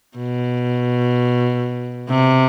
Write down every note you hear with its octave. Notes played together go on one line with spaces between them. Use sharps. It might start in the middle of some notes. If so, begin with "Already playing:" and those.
B2
C3